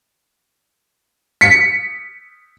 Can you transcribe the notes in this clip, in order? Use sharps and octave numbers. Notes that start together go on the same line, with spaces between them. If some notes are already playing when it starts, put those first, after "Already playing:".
B6 C#7